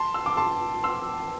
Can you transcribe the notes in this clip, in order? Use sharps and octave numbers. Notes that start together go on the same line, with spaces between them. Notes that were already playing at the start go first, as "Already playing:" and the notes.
Already playing: A5 C6
E6
D6
A5 C6
C6 E6